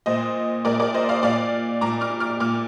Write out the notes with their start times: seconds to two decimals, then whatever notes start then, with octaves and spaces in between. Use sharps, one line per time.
0.06 A#2 C5 D#5
0.65 A#2 A#4 D5
0.80 A#4 D5
0.94 C5 D#5
1.09 D5 F5
1.23 A#2 D5 F5
1.81 A#2 A#5 D6
2.01 D6 F6
2.20 D6 F6
2.40 A#2 D6 F6